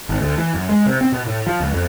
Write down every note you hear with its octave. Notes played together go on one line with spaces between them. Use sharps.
G#1
D2
E3
F#2
G#3
C3
C4
B2
A2
F3
C#2
F2